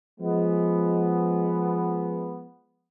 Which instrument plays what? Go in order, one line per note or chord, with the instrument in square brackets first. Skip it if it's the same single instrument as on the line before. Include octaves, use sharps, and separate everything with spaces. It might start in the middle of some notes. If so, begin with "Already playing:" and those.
[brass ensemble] F3 G#3 B3